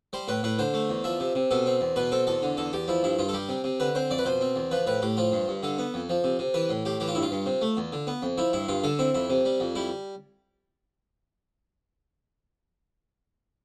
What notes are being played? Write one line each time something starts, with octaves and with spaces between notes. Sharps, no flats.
G3 C5
A2 B4
A2 B4
D3 C5
A3
E2
F3 E5
C3
C3
B2 A4
C4
E2
B2 B4
C4 A4
E2 A4
D3
E2 A4
E2 G4
F3 E4
G2 E4
G2 F4
A4
G3 G4
C3
C3
D3 B4
C4 C5
F2 D5
B4
B2 C5
C4
E2
F3 B4
A2 B4
A2 G4
F3 F4
G2
G2
D3 A4
B3
F2
F3
C3
C3
E3 B4
A2
A2 G4
E3 G4
F4
G2 E4
F4
G2
C3
A3
E2
D3
B3
F2
F3 E4
G2 E4
G2 F4
D3 A4
C4 E4
F2 E4
C3
G3
F2
G3 E4